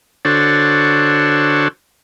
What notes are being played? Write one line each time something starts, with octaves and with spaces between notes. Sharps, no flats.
D3 D4 F#4 A4 C5 C#5